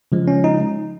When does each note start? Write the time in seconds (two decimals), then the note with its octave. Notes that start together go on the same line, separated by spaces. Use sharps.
0.12 C#3 F3 G#3
0.28 C#4
0.44 D#4